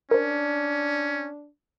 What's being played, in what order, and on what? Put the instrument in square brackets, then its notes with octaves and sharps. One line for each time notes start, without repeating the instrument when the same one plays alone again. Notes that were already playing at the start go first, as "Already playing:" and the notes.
[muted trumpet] C#4 [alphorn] D4 [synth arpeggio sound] A#4 C5